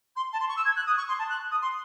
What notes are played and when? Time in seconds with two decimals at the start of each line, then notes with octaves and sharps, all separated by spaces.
0.16 C6
0.32 A5
0.40 C6
0.48 C#6
0.56 E6
0.64 G#6
0.76 F#6
0.86 D#6
0.97 C#6
1.08 C6
1.18 A5
1.29 F#6
1.51 D#6
1.61 C6